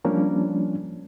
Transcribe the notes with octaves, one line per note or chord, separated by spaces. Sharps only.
F3 G3 A#3 C#4 D4